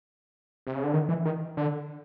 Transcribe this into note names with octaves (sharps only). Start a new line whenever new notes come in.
C3
C#3
D3
D#3
E3
D#3
D3